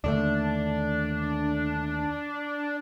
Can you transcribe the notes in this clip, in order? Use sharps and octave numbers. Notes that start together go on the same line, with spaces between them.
D#2 D3 A3 D4